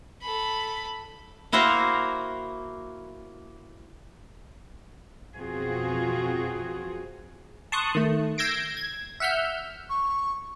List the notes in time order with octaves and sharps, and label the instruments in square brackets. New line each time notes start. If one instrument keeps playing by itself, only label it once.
[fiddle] A4 B5
[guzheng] A#3 E4 F#4 C5 F5 A#5
[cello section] F2 B2 C4 F4 F#4 G#4
[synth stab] A5 C6 C#6 D#6 F#6
D#3 A3
E6 G6 G#6 A#6 C7 D7
G#6
E5 F#5 E6 F6 G6
[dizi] C#6